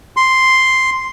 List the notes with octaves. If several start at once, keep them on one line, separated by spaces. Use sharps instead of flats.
C6